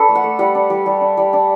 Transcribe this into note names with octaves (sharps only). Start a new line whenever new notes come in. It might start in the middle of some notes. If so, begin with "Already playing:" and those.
Already playing: D4 A4 B4
A3
F#5
A3
G3 F#5
D4
G3
G3
D4
G3
D4